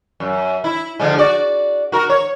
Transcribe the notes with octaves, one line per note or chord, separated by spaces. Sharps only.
F#2
E4
D3 F3 G#3
F#4 D5
F#4 A#4
C#5